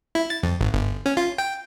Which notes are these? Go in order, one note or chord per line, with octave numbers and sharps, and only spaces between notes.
E4
A6
F2
G#1
G1
C#4
F4
G5